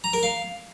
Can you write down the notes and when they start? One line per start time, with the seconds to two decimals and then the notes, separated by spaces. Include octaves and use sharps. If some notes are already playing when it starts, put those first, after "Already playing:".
0.04 A#5
0.13 A#4
0.23 F5